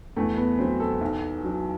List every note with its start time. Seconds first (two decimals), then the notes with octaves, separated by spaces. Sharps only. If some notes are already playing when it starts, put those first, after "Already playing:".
0.16 E2 A3
0.37 B3
0.59 F#3 C4
0.80 A4
1.01 B1
1.44 F#3